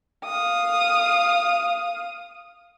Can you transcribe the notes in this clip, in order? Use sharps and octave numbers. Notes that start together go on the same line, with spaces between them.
F5 D#6